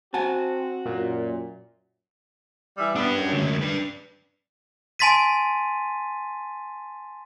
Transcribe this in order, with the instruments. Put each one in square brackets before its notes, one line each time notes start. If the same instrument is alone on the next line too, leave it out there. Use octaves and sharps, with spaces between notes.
[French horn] C4 [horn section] F#4 [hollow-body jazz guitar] F#5 G#5 A5
[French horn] F#2 [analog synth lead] A#2
[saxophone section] E3 G3 E5
[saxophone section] B3 [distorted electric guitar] D4 G4
[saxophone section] F#2
[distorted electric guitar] D2 G#3
D4 B4
[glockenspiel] G#5 A5 C6 A6 B6 D#7